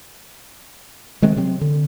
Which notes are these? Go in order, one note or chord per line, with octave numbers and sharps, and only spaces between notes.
D#3 G#3 A3 C4
C3 F#3 C4
D3